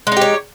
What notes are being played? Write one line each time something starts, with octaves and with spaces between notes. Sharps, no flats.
G#3 D#4 G4 C#5